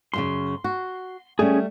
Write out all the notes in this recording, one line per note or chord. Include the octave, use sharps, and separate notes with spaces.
F#2 A2 C#3 C6
F#4
G3 A3 C#4 G#4